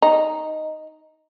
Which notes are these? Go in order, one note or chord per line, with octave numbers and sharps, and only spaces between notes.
D#4